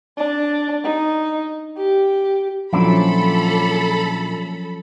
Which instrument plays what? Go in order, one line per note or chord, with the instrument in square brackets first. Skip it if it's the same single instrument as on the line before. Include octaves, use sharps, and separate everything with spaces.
[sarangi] D4
D#4
G4
[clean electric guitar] A#2 D4 E4 [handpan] F3 F#3 C#4 [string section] A4 B5